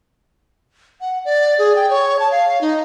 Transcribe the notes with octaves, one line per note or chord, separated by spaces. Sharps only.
F#5
D5
G#4
G5
C#5
A5
F5
D#4